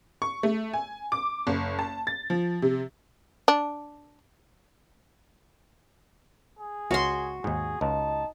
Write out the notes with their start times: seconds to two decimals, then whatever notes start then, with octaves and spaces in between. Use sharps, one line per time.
0.22 C#6
0.43 A3
0.73 G#5
1.12 D6
1.47 F#1
1.79 A5
2.07 A6
2.30 F3
2.62 C3
3.48 D4
6.59 G#4
6.91 C#2 F#4 C#5 C6
7.44 D#2 G#2 G#4
7.81 C#2 D#4 A5